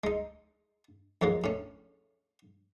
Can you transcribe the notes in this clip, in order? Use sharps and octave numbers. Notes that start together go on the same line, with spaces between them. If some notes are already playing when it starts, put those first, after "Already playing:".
G#3 D#4
F2 G#2 F#3 A#3
A2 C#4